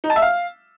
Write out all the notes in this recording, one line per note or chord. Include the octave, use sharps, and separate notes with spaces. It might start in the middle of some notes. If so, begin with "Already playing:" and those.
D#4
A5
E5
F5